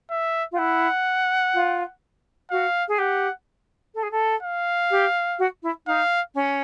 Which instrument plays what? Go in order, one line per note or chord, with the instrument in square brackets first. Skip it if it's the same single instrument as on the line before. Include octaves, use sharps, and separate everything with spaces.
[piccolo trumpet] E5
[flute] F4
[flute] E4 [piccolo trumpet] F#5
[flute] F4
[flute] F#4 [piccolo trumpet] F5
[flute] G#4
[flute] G4 [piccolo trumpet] F#5
[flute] A4
G#4
A4
[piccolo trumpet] F5
[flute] G4
F#4
E4
[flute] D#4 [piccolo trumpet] F5
[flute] C#4